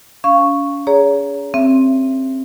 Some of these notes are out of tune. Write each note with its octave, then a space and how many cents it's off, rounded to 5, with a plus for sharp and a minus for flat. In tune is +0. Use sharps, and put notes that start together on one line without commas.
C#4 +40 F5 -10 C#6 +0
G#4 +0 C#5 +35 A#5 +0
C4 +15 E5 +25